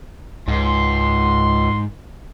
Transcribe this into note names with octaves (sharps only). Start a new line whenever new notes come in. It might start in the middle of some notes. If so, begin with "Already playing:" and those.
C#2 G#2 C6